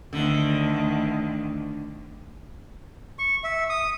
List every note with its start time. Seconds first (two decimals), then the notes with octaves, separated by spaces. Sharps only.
0.13 D2 D3 D#3
3.19 C#6
3.44 E5
3.70 D#6